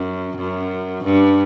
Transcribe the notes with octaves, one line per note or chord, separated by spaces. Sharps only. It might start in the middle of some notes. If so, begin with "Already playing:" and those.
Already playing: F#2
F#2
G2